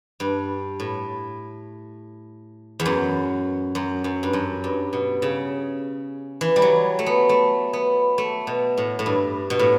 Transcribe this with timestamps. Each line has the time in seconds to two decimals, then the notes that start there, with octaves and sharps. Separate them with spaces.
0.20 G2
0.80 A2
2.80 E2
2.86 F#2
3.75 F#2
4.04 F#2
4.23 G2
4.33 F#2
4.64 G2
4.93 B2
5.22 C#3
6.41 E3
6.56 G3
6.62 F#3
6.99 A3
7.06 B3
7.29 A3
7.73 B3
8.18 A3
8.47 B2
8.78 A2
8.99 A2
9.06 G2
9.50 B2
9.59 A2